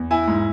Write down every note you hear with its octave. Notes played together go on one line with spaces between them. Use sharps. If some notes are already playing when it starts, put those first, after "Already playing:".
Already playing: E2
E4 G#5
G#2